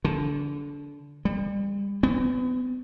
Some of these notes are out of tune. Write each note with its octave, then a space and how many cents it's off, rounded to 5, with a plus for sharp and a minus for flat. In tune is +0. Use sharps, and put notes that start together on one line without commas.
D3 -25
G3 +35
B3 +35